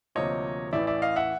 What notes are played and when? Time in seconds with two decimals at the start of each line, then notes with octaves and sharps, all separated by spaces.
0.15 D2 C3 F3 A#3 C#5 D#5
0.73 A1 A2 E3 D5 E5
0.87 D5 E5
1.02 D#5 F5
1.16 E5 F#5